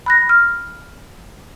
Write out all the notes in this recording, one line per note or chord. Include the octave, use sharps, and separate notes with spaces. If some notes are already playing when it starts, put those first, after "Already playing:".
B5 F#6 A#6
F6